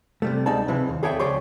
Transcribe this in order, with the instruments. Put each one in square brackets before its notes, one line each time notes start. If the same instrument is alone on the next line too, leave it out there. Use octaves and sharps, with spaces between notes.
[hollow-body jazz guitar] C3 G3 A3
D2 G#3 D#4 D5 A5
C3 E3 F3 C4
D#2
G#4 A4 C#5 D5 E5 G5
C#2 F3 G4 C#5 D5 C6